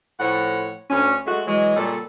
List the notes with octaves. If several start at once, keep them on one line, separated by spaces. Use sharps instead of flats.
A2 F3 C#5 F#5
D2 D3 C#4
G#3 A3 F#4
E3 F#3 G#3
A#2 C#3 G3 A4